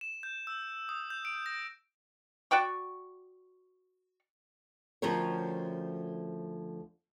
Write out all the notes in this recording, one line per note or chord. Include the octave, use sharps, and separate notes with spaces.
E7
G6
E6
D#6
G6
D7
A#6
F#4 D5 G5 C#6
D2 F3 C#4 G4 A#4 C#5